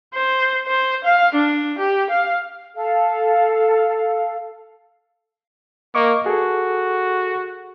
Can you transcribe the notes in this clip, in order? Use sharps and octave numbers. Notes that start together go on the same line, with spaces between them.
C5
C5
F5
D4
G4
F5
A4 F5
A#3 D#5 C#6 D6
F#4 G#4 A4